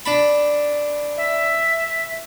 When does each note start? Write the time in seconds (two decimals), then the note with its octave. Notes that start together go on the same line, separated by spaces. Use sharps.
0.06 D4 A5 B5
1.17 E5